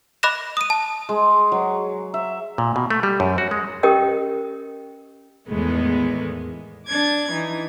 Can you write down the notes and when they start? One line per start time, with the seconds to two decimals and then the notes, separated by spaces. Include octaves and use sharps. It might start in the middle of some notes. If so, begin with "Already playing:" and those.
0.23 D#5 B5 D6 F#6 A#6 E7
0.57 D#6 D#7
0.70 A5
1.09 G#3
1.52 F#3
2.14 E5
2.58 A#2
2.76 B2
2.90 A3
3.03 G3
3.20 F#2
3.38 F#4
3.51 G#3
3.83 C#4 G4 A#4 D#5 G5 D#6
5.48 E2 A2 D#3 G#3 A3 B3
6.87 D4 D6 G#6
7.31 E3 D#4